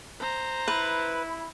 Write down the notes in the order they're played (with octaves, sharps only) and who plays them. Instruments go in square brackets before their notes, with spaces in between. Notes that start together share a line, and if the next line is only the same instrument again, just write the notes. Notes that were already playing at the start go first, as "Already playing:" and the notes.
[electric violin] C5 A#5
[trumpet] E4 [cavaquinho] B4 [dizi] B5